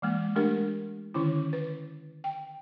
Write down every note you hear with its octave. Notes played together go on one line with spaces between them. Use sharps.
E3 G#3 A#3
G#3 A3 D4 G4 A#4
D3 D#3 C#4 E4
B4
G5